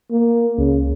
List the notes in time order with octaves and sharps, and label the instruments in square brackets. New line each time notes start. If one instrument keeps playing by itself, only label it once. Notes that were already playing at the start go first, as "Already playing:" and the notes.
[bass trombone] A#3
[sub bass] C#2 [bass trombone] C#3